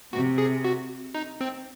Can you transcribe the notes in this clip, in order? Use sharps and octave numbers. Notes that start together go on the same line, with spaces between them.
C3 F#4
G#4
F#4
D#4
C4